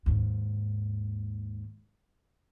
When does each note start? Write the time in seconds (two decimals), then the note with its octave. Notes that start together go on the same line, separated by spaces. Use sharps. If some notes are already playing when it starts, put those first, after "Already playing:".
0.06 D#2 G#2